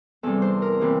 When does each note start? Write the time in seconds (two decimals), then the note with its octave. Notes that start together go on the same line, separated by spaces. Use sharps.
0.23 E2 C3 G3 A4
0.42 C5
0.62 A#4
0.80 C3 E3 A#3 G4